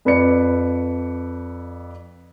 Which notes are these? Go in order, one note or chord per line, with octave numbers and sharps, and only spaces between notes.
F2 B4 D5 C#7